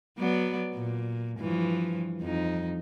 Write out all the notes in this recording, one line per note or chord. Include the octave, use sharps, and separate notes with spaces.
F#3 B3 D5
A#2
G2 E3 F3
F2 D#4